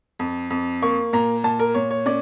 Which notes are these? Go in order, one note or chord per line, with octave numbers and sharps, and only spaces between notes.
F2
F2
A#3 C#6
A#2 A#5
A#2 A5
A#4
A#2 C#5
C#5
C#4 D5